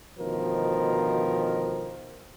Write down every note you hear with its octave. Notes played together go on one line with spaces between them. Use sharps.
D2 B2 D#3 F3 A#4